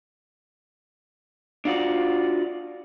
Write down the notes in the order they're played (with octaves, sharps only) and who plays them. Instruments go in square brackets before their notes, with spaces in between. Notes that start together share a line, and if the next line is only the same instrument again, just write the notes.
[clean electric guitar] D4 F4 F#4 D5